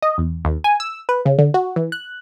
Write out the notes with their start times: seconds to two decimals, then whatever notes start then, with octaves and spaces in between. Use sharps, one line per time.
0.02 D#5
0.18 E2
0.45 D#2
0.64 G#5
0.80 E6
1.09 B4
1.25 C#3
1.38 D3
1.54 F#4
1.76 E3
1.92 F#6